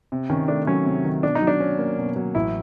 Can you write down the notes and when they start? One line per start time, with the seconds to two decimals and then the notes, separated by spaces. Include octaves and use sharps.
0.12 C3
0.30 D#3 C#4
0.48 A3 D4
0.67 F#3 C#4
0.86 C3
1.05 D#3
1.23 B2 D4
1.35 D#4
1.42 F#3
1.47 D4
1.60 C#4
1.79 A#3
1.98 B2
2.16 F#3
2.35 A1 E4